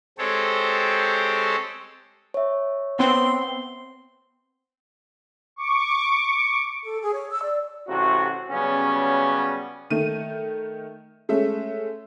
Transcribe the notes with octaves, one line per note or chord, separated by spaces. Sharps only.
G#3 C4 G4 A4 C5 C#5
C#5 E5
B3 C4 C6
C#6 D6
A4
G#4
C#5
E6
D5
A1 C3 F#4
C#3 F#3 G3 B3 C#4
D#3 A3 D#7
G#3 A3 C#4 E5